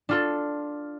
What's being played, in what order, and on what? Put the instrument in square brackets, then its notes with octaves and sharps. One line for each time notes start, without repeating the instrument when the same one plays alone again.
[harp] D4 F4 A4